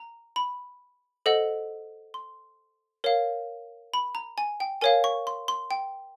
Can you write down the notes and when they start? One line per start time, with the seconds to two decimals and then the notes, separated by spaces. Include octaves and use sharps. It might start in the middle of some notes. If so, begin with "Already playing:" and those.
Already playing: A#5
0.36 B5
1.26 A4 C5 D#5 F#5
2.14 C6
3.04 A#4 C#5 F5
3.94 B5
4.15 A#5
4.38 G#5
4.60 G5
4.81 A#4 C#5 F5 G#5
5.04 C#6
5.27 C6
5.48 C6
5.71 G5